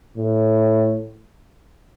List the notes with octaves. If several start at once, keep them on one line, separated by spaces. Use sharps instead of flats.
A2